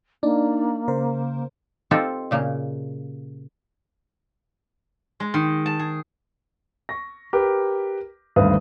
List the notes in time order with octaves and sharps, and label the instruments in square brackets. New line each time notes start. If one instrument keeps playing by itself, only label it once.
[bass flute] A#3 [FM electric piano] D4 D#4 D5
[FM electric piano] C#3 A#4 C5
[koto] C4 D#4 F4 G4 A4 C5
A#2 C#3 A#3
[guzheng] G#3
D#3
A5
G#4
[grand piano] C#6 A#6
G4 A#4 B4
G#1 D2 G2 B4 F5 D#6